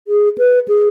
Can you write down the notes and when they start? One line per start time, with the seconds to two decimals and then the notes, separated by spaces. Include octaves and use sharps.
0.08 G#4
0.38 B4
0.68 G#4